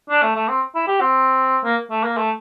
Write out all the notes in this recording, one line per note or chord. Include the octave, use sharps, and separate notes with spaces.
D4
A3
A3
C4
E4
G4
C4
A#3
A3
A#3
A3